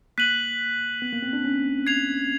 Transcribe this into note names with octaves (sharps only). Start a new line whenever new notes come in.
A#3 F#6 B6 D#7 F#7
B3
A#3
C4
D4
C#4
G#6 C7 F7